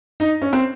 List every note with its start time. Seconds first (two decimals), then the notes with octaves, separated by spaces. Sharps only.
0.20 D#4
0.42 C#4
0.53 C4